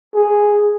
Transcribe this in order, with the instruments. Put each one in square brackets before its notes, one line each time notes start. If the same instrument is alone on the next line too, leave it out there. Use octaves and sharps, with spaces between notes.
[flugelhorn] G#4